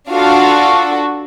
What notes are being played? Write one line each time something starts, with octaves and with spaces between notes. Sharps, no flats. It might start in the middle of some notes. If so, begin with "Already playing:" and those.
D4 F4 F#4 A4 F5